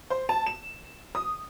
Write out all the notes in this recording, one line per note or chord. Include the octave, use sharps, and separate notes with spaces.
C5
A5
E7
D#6